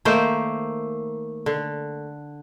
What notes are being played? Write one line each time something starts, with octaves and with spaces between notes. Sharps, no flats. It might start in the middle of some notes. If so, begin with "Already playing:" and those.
D#3 A3 A#3 C5
D3